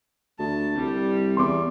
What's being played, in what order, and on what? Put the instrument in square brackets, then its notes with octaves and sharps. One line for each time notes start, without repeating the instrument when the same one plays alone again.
[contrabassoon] D2 [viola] A5
[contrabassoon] C2 [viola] G3
[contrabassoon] E2 [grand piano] C6 D6